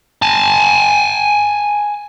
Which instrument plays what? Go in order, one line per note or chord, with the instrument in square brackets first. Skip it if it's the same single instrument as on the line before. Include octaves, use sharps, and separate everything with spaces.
[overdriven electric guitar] G#5 A5